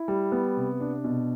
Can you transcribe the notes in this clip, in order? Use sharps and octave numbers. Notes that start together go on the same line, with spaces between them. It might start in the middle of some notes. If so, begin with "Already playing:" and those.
Already playing: E4
G3
B3
C3
D4
B2